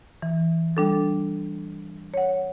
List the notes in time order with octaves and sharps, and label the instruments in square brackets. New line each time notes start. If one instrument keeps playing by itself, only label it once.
[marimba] E3
G3 D4 A4
C#5 F#5